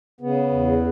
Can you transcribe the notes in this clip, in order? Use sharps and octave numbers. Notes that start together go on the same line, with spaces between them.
C#3 B3
E2